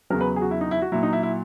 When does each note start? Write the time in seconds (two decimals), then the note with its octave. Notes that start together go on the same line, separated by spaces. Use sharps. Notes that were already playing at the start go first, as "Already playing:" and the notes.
0.10 E2 C#3 F#3 A#4
0.21 B4
0.36 G#4
0.42 F#4
0.51 E4
0.61 D#4
0.71 E4
0.82 F#4
0.92 A#2 F#3 E4
1.03 D#4
1.13 E4
1.23 E4